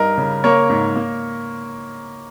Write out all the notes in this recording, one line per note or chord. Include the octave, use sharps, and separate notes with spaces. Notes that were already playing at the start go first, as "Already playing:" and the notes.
Already playing: G2 D#4 A#4
C#3
A#3 A#4 C#5
G#2
A#3